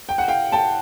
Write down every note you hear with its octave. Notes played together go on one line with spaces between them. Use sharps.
G5
F#5
F5 G5
G5 A5